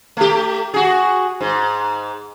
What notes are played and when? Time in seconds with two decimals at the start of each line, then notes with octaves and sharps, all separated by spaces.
0.17 A3 G4
0.74 F#4 G#4
1.41 G#2